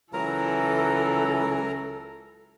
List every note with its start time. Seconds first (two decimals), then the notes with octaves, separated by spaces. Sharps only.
0.13 C#2 E3 F#3 A4 A#4 A#5